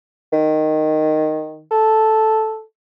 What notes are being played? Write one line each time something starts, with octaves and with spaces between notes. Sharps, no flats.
D#3
A4